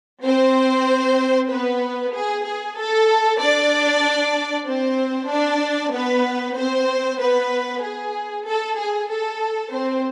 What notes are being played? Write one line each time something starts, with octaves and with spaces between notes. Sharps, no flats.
C4 C5
B3 B4
G#4
G#4
A4
D4 D5
C4 C5
D4 D5
B3 B4
C4 C5
B3 B4
G#4
A4
G#4
A4
C4 C5